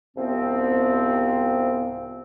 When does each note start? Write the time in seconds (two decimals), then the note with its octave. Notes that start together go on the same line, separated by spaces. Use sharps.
0.16 C2 G#2 C3 F3 B3 C4